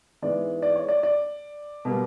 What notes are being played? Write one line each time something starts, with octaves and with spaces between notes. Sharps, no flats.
G#2 E3 G#3 B3 D5
D5
C#5
D5
D5
B2 G3 A#3